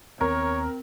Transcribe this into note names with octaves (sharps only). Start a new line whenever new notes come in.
D#2 B3 C4 A#4 C#5